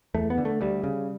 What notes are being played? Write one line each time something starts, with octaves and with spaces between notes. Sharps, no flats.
E2 A3
B3
D3
A3
D2 G3
C#3